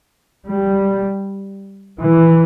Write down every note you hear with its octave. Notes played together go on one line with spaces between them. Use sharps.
G3
E3